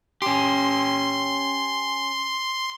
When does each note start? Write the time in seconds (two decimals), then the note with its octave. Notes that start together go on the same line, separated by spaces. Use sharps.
0.22 C#4 G4 C6